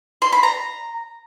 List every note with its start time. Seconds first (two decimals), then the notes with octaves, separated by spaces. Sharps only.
0.22 C6
0.32 B5
0.43 A#5